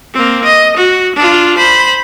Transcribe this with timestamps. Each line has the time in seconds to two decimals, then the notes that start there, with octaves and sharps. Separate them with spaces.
0.14 A#3 C4
0.45 D#5
0.77 F#4
1.16 D4 F4
1.57 C5 B5